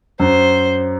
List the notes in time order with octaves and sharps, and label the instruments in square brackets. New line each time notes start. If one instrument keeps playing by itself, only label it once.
[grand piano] F#2 [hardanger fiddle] C5